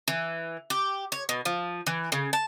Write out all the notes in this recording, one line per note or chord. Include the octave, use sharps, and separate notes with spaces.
E3
G4
C#5
B2
F3
E3
C#3
A5